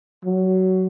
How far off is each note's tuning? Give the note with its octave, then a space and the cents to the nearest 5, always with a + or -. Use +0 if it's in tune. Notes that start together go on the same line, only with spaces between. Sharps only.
F#3 +15